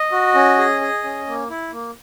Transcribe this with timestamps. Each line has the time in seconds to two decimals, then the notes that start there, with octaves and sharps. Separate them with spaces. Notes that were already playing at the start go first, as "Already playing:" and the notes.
Already playing: D#5
0.12 F#4
0.35 C#4
0.59 G#4
0.81 G#4
1.04 C#4
1.27 A#3
1.50 E4
1.72 A#3